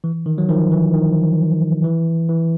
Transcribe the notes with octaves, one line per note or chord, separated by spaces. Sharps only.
E3
D#3
F#3
D#3 F3
E3
D#3
E3
E3